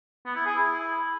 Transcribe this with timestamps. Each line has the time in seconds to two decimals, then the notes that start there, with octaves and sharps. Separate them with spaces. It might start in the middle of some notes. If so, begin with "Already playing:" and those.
0.26 B3
0.36 E4
0.46 G#4
0.55 E4